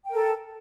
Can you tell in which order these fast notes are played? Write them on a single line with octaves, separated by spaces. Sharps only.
G5 A#4 A4